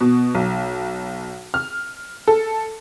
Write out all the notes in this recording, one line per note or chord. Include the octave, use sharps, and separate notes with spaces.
B2
B1
F6
A4